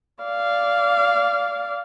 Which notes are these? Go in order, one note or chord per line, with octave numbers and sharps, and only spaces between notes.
D5 F5